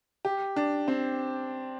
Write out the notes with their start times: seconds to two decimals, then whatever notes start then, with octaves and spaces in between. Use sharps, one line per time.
0.25 G4
0.56 D4
0.88 C4